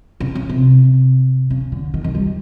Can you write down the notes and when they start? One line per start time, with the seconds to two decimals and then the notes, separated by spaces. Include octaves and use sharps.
0.20 C#3
0.35 C#3
0.49 C3
1.50 C#3
1.72 D3
1.94 D#3
2.04 D#3
2.15 G3